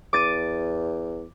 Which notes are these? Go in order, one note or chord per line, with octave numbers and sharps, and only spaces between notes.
E2 D6 A6 D#7